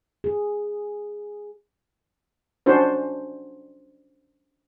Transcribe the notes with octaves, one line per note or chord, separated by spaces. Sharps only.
G#4
C#4 D4 F#4 C5